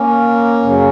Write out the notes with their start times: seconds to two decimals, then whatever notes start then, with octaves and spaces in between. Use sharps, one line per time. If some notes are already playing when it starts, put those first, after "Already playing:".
Already playing: A#3 C#4
0.63 F#2 C#3 F#3